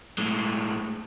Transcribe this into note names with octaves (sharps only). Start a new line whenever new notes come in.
A2 G#3